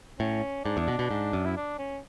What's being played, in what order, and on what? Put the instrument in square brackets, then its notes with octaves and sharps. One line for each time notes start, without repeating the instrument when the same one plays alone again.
[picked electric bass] A2 [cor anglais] C#4
[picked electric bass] G#2 [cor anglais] D4
[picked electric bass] E2
B2
B2
G#2
F#2
[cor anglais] E4
D4
C#4